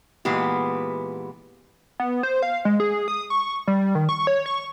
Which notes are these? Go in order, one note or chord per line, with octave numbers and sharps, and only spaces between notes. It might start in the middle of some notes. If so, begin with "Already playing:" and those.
A#2 E3 G#3 B3 G4
B3
C5
F5
G#3
G#4
D#6
C#6
G3
D#3
C#6
C#5
C#6